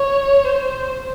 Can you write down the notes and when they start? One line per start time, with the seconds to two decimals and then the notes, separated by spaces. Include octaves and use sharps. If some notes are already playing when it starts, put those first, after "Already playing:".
Already playing: C#5
0.45 C5